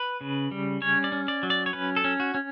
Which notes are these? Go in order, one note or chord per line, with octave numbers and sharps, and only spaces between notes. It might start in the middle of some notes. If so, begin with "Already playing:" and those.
Already playing: B4
C#3
G3
C#4 C#5
D5
C#4
D5
F#3
D5
C#5
C#4 B4
A4
C#4
F#4
C#4